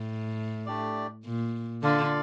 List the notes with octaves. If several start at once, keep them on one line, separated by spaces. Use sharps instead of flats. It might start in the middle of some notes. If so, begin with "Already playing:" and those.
Already playing: A2
A3 D4 G4 D5
A#2
D3 F4 A4 D5 F5